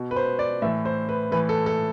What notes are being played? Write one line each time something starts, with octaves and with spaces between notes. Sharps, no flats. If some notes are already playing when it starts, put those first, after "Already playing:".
Already playing: B2
B4
C5
D5
A2 E3 E5
C5
B4
A2 E3 B4
A4
A4